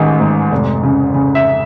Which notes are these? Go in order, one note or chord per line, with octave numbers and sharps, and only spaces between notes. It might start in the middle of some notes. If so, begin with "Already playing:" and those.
Already playing: A1 D#3 G#3
G#2
F1
C#3
C#3
E5